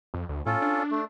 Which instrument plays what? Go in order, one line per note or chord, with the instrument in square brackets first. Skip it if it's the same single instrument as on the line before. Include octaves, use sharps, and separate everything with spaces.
[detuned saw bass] F2
D2
[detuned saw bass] A2 [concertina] C#4 F4 A4
[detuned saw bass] D4
[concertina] A3